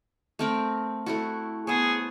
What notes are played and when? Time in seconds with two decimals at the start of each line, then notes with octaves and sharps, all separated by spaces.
0.39 A3 C4 A#4
1.06 A3 E4 F#4
1.67 B3 G#4 C5 C#5